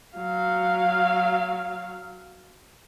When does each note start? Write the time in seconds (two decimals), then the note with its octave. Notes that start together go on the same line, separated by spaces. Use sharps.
0.16 F#3 F5